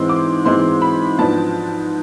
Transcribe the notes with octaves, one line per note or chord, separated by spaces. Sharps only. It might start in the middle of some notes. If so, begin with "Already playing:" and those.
Already playing: G#2 E3 G#3 C4 C6
D6
G#2 E3 G#3 C4 C6
B5
G#2 F3 B3 D4 A5